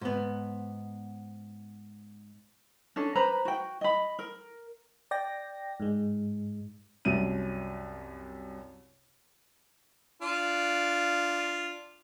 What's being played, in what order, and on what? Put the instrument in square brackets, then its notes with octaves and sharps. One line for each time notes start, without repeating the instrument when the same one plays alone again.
[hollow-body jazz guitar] G#2 B3
[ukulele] C#4 D4 A4
B4 C5 A#5 B5
F#4 G5
D#5 B5
A#4
[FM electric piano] D5 G5 A#6
G#2 G#3
[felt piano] C2 F#2 C3 D#7
[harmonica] D4 F4